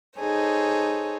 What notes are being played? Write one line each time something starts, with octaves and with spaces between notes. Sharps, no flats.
D#4 G#4 A4 C5 C#5